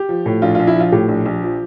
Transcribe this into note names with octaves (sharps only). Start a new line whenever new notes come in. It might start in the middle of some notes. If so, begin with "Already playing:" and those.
Already playing: G4
F3
A2
A#1 F4
A#1 F4
E4
F3 F4
A2 G4
A#1
A#1
F3